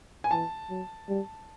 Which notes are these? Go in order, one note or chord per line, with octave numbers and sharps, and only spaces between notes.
G#5
E3 A5
F#3
G3